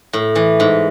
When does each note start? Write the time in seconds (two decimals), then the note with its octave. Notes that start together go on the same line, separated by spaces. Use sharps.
0.13 A2
0.35 E3
0.60 G#2